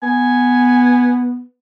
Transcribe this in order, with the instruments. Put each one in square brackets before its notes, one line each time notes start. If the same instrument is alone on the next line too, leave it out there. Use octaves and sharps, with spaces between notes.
[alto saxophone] B3 [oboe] G#5